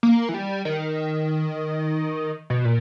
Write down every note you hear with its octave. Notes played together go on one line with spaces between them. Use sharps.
A#3
E3
G3
D#3
B2
A#2